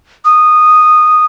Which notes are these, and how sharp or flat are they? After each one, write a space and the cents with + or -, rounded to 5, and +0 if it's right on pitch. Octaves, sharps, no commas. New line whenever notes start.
D#6 -10